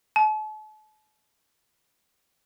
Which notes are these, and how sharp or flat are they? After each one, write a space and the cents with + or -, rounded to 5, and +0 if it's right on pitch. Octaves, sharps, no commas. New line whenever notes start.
A5 -40